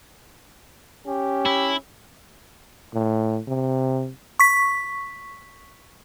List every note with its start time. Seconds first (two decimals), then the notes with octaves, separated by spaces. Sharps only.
1.07 C#4 G4
1.46 E4
2.94 A2
3.48 C3
4.39 C#6 B6